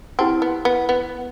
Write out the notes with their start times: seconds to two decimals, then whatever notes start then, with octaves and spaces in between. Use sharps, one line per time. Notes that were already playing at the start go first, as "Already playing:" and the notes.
0.19 C4 E4 G4 B4 F#5 A5
0.42 B3
0.65 B3
0.89 B3